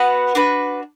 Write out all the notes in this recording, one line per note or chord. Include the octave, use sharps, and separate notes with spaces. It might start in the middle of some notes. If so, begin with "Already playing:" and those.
Already playing: B3 F#4 B4 F#5
D4 F#4 B4